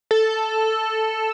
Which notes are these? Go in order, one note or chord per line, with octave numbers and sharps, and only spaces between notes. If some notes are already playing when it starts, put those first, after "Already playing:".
A4